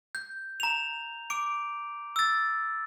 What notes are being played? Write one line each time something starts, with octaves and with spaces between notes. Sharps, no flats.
G6
A#5 F7
D6 D7
E6 A6